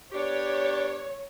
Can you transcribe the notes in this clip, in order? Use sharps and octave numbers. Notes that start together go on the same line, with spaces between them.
B3 D4 G4 C#5